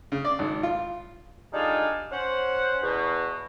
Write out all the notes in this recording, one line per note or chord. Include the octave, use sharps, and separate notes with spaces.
C#3
D5
G#1
F4
G3 D4 D#4 F4 G#4 A4
C#4 C5 F#5
E2 B2